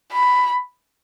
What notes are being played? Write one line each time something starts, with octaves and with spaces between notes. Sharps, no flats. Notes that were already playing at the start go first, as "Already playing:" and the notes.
B5